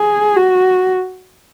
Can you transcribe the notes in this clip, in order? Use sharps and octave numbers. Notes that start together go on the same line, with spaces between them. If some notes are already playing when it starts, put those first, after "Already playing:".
Already playing: G#4
F#4